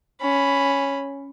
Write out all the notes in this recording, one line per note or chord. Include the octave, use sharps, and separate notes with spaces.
C#4 B5